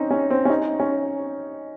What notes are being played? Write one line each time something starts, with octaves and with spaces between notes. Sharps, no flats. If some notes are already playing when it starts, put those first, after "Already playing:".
Already playing: C4 C#4 D#4
C#4
C4
C#4
D#4
C#4